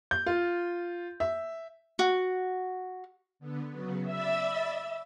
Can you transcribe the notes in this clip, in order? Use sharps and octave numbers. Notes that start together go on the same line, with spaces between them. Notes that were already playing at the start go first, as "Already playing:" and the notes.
G6
F4
E5
F#4
D3 B3
C#3 F#3 B3
D5 E5 B5 A6